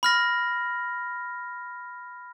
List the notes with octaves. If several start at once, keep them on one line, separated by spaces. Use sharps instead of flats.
B5 F6 A#6